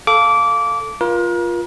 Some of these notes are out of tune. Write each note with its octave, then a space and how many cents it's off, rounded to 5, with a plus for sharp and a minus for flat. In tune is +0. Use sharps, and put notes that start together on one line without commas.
A4 +0 F5 +0 D6 -20
F4 +0 A#4 +40